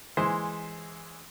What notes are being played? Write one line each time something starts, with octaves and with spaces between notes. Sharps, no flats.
E3 G#3 C5